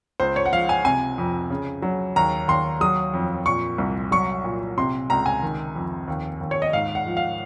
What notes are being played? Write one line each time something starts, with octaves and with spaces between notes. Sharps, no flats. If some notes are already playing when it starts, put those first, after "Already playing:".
C#2 C5
C#5
F#5
F3 F5
G#5
C3 G#5
F2
C#3
F#3
D#2 A#5
D#2 C6
F#3 D#6
F2
A#2 C#6
C2
F#3 C#6
A#2
C3 C6
C#2 A#5
G#5
D#3
F2
D#2
D#2
C#5
D#5
G#2 F5
F#5
F3
F5